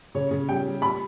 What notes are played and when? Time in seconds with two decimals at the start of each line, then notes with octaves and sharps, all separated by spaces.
0.15 C#3 C#5
0.31 C#3
0.48 G3 G5
0.66 G3
0.82 G3 B5